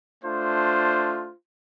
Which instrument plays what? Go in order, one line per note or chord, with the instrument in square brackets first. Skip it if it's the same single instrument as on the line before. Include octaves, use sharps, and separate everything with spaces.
[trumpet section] A3 D4 F4 C5